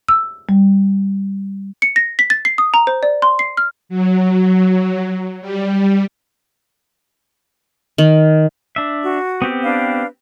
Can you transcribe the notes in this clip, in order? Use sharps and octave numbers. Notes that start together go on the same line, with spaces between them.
E6
G3
C#7
A#6
B6
A6
C7
D#6
A#5
C5
D5
C6
C7
F6
F#3
G3
D#3
D4 E5
F#4
B3 C4 G4
D4 B4 F5